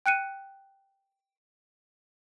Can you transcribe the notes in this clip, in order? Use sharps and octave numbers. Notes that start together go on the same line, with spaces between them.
G5 F#6 C#7 D#7